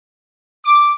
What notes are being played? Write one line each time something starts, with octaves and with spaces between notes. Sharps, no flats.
D6